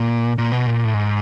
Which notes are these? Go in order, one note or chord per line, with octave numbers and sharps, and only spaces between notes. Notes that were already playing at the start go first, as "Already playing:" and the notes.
Already playing: A#2
A#2
B2
A#2
A2
G#2